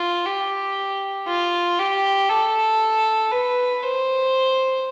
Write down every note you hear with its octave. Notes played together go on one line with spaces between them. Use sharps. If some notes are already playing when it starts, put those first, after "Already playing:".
Already playing: F4
G4
F4
G4
A4
B4
C5